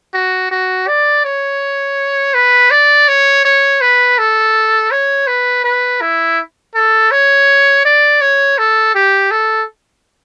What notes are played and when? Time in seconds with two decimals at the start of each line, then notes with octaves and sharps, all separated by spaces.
0.14 F#4
0.51 F#4
0.88 D5
1.25 C#5
2.34 B4
2.71 D5
3.08 C#5
3.45 C#5
3.81 B4
4.18 A4
4.91 C#5
5.27 B4
5.64 B4
6.01 E4
6.75 A4
7.11 C#5
7.85 D5
8.21 C#5
8.58 A4
8.95 G4
9.31 A4